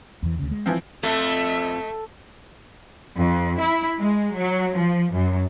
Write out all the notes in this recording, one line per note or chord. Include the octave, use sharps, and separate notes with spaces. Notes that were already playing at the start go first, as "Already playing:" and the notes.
E2 E3
D2 C#3
G#3
E3 F3 C4
F2 A3 E5
F2
E4
G#3
F#3
F3
F#2